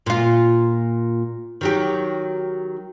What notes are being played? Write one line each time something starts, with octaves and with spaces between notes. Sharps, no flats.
A#2 F4
D#3 F#3 G4